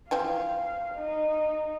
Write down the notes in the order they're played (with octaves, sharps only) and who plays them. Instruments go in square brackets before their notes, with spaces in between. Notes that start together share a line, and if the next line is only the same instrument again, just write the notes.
[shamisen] E3 F3 C4 [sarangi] F5
[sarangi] D#4